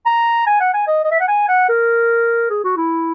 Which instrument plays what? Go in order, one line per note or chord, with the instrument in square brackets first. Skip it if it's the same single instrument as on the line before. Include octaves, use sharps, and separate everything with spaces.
[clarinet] A#5
G#5
F#5
G#5
D#5
D#5
E5
F#5
G#5
F#5
A#4
G#4
F#4
E4